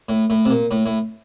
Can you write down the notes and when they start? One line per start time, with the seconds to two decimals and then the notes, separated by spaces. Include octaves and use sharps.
0.09 A2
0.30 A2
0.45 C3
0.50 A#2
0.71 A2
0.86 A2